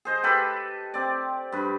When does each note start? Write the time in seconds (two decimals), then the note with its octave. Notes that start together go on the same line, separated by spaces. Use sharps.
0.05 G#4 C5 D#5
0.23 G4 A4 B4
0.94 C4 D5
1.52 G2 B4